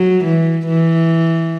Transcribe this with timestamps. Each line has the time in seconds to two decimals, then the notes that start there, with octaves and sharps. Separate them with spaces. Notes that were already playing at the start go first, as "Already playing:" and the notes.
Already playing: F#3
0.24 E3
0.66 E3